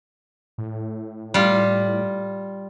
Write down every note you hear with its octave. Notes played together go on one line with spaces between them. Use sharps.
A2
G3 F4